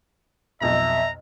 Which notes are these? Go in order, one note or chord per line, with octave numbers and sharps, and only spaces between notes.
B1 F2 B2 E5 A#5